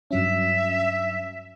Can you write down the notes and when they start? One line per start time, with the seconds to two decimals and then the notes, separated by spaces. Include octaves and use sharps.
0.11 G2 F#3 C#4 E5